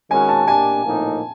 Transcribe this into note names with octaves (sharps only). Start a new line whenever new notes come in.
D#3 G#3 C#4 F#4 A#4 G#5
A5
A#3 D4 G4 G#5
A2 F3 A#3 D#4